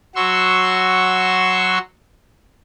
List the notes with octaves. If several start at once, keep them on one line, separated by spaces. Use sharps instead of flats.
F#3 F#4 C6 C#6 E6